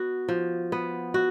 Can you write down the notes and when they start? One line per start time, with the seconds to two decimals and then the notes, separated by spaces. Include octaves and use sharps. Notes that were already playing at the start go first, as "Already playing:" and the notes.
Already playing: B3 F#4
0.29 F3
0.72 B3
1.14 F#4